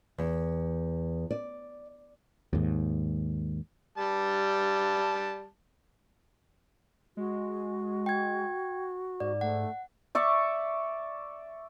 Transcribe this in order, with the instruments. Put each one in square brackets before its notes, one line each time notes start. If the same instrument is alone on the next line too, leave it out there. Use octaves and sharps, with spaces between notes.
[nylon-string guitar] E2
D5
[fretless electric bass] D#2 G#2
[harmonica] G3 A5
[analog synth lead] G#3 [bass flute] F#4
[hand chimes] G5 G#6
[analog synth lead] G#2 [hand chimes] D5
[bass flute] A3 [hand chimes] F#5
[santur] D5 E5 C#6